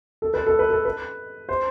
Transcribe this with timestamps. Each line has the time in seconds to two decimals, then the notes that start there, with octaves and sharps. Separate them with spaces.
0.22 A4
0.34 B4
0.47 A4
0.59 B4
0.70 A4
0.85 B4
1.49 C5